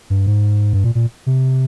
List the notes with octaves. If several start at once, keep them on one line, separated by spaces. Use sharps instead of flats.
G2
G#2
G2
A#2
A#2
C3